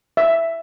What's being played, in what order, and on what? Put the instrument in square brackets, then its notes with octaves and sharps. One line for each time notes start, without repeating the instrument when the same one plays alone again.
[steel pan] E5